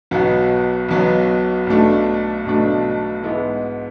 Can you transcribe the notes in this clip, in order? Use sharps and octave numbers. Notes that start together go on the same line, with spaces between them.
B1 B2 F#3 B3
B1 B2 F#3 B3
B1 B2 A3 D4
B1 B2 A3 D4
G#2 G#3 B3 E4